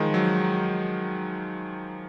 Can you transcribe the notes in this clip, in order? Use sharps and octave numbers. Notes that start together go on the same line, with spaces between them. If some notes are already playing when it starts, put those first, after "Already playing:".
Already playing: D#3 F3 G#3
F#3